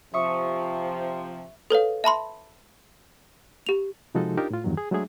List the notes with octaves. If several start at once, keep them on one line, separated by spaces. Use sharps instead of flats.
C3 F3 E5 C#6 D#6
A4 B4 C#5 F5
E5 A5 B5 C6
G4 F7
C3 F3 G#3 D#4 F#4 A4
D4 D#4 F4 G4 A#4
A2 F4
E2 G2 D#3 F#3
G#4
F#3 G#3 A3 D4 G#4 E5